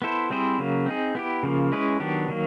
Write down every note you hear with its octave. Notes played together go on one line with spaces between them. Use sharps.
B3 E4 A4 C5
G3 C4 E4 G#4 C5
C#3 F#3 A#3
C4 D#4 G#4
B3 E4 G4
C#3 F3 A#3
G#3 C#4 E4 G#4 B4
D#3 F#3 B3 D4 G4
D#3 F#3 A#3